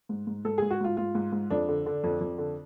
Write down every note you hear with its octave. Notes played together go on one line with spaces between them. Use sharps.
G#2
G#2
G#2 A4
G#2 G#4
F#4
G#2 F4
G#2 F4
G#2
G#2
F2 D4
D3
D3
F2
F2
D3